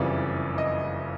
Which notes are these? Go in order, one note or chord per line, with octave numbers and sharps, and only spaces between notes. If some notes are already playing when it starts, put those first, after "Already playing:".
Already playing: F#1 F2 C#3 E3 G3 D5
D#5